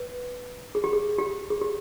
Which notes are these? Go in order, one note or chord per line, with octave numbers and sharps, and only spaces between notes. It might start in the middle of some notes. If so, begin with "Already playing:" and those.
Already playing: B4
G#4
G4
G#4
G4
G#4
G4